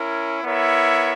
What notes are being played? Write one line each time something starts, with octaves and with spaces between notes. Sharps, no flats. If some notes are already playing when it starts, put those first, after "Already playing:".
Already playing: C#4 E4 A#4
B3 E4 A#4 C#5 E5